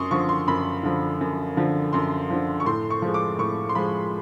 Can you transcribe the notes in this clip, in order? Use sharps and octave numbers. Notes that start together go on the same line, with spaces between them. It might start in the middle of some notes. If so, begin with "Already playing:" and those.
Already playing: F#2 C6 C#6 D#6
D3 F3 C#6
C6
F#2 B5
D3 F3
F#2
D3 F3
F#2 C6
D3 F3
C#6
A2 C6
C#6
F3 G#3
D6
A2 C#6
C6
F3 G#3 B5